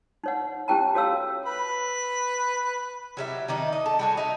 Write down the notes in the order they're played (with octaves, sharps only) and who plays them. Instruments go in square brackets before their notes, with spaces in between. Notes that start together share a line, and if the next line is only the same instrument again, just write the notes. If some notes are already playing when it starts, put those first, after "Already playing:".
[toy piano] D#4 C#5 F#5
C#4 E4 G4 G5 A5 A#5
F#4 A4 C#5 F5 E6
[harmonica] B4 B5
[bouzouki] F#3 G3 E4
D#3 D4 D#4
D#5
A4
G3 F#4 G#4
D#4 E5